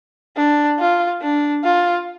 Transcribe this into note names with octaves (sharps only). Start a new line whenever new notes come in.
D4
F4
D4
F4